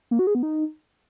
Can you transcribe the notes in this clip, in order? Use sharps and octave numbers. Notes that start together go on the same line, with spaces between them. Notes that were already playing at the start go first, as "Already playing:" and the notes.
A#3
F#4
G#4
B3
D#4